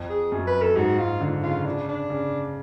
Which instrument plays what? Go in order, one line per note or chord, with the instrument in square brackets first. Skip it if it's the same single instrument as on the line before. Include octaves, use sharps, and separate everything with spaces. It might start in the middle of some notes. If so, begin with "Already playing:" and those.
Already playing: [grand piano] F2
[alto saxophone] G#4
[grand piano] F#2
[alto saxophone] B4
A4
[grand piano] G#2 [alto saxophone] F#4
[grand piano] G#2 [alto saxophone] F4
[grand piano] D3
[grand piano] C#3 [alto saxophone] F4
[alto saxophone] D4
D4
[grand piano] C#3